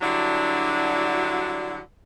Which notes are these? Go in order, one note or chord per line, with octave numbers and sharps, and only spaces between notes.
D3 F#3 G3 D4 E4 F#4